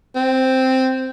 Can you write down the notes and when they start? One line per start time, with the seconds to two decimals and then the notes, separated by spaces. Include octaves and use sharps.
0.16 C4